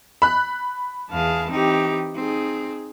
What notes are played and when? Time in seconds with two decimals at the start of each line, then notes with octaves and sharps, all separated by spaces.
0.22 B5 F#6
1.11 E2 G#4 F5 A5
1.51 E3 C4 D#4 G4
2.15 C4 D#4 G#4